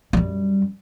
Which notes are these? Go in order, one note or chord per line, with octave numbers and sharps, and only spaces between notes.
F#2 G3